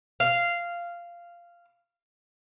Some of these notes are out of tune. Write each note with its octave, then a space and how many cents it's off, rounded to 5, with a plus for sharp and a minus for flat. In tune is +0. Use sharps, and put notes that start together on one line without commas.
F5 -10